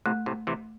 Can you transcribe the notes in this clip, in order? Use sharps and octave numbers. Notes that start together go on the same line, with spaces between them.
A2 C3 A3
A2 C3
C3 E3 A3